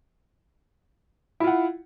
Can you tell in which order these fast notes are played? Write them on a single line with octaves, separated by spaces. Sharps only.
E4 F4 F#5